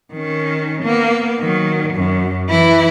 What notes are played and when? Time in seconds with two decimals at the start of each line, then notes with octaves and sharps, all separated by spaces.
0.14 D#3 C#4
0.83 A#3 B3
1.41 D#3 F#3
1.95 F#2
2.50 E3 E4